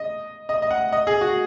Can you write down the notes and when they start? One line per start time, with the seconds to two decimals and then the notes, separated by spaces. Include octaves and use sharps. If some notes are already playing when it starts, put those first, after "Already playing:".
Already playing: D#5
0.49 D#5
0.62 D#5
0.71 F#5
0.92 D#5
1.07 G#4
1.21 F#4